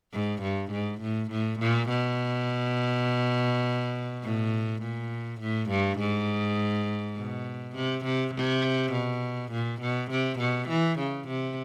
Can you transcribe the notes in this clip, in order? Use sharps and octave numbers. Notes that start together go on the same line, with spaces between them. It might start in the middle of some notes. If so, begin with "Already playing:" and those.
G#2
G2
G#2
A2
A2
A#2
B2
A2
A#2
A2
G2
G#2
B2
C3
C3
C3
B2
A#2
B2
C3
B2
E3
C#3
C3